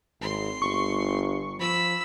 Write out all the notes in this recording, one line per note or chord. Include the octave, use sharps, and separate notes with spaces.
G#1 C6
G1 C#6
F3 B5 E6